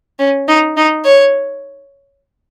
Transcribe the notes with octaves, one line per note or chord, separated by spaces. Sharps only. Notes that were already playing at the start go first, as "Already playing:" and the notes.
C#4
D#4
D#4
C#5